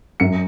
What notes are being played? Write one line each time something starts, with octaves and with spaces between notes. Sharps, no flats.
F#2 C#7